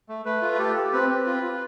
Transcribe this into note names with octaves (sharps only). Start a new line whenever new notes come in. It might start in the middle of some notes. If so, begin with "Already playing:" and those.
A3
A3 B4
F4
B4
G4 A4
G4
C4 B4
C4
F4
F4